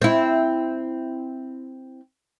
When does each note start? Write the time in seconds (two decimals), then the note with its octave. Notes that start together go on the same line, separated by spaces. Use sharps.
0.02 C4 E4